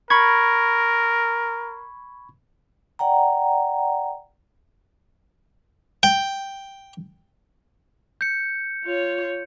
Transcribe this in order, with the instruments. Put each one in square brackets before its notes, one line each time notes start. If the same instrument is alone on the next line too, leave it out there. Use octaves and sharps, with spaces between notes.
[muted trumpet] A#4 [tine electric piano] B5 C#6 G#6
[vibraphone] D5 F#5 G5 A#5
[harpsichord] G5
[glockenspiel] G6 C#7
[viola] F4 C#5